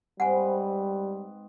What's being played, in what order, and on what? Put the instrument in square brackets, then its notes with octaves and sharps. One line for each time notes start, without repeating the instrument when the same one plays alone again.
[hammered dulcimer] G#2 C4 B4 [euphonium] G3 [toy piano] F#5 G#5